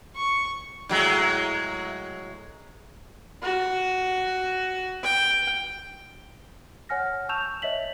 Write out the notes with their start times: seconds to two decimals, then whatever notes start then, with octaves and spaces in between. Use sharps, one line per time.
0.16 C#6
0.89 A2 F#3 G#3
3.42 F#4
5.03 G5
6.89 C#5 F#5 G#5 F6 A#6
7.29 A5 C#6 E6 G6 E7 F7
7.62 C#5 D#5 E5 B6 F#7